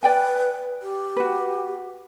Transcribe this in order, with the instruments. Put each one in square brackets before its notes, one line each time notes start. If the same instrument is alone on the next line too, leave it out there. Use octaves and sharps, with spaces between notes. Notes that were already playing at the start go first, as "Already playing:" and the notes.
[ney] B4 [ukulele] D5 G5 G#5
[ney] G4
[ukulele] F#4 B4